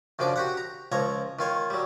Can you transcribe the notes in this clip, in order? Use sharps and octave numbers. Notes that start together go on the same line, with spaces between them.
F#2 C#3 F3 D4 D6
F#4 G4 F#5
A#5
C#2 F3 C#5 A#5
D#3 F4 C#5
F#3 G3